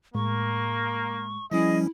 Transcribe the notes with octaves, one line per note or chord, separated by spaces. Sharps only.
A2 G#3 A#3 C#6
F3 G3 C#4 E4 G#4 D#5